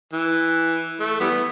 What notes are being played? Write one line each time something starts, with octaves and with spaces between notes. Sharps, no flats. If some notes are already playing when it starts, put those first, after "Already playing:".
E3
A3
E3 G3 B3